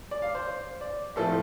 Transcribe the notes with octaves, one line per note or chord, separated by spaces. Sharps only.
D5
F5
C5
D5
A2 F3 A3 C4 A4